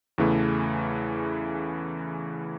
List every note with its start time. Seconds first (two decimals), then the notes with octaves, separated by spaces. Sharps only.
0.18 E2 C#3 E3 A3